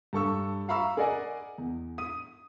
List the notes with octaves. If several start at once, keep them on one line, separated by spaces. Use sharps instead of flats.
G2 A4 C#6 E6
E5 F5 A#5 B5 C#6 E6
G#4 A#4 D5 D#5 F#5 G#5
E2
D#6 D#7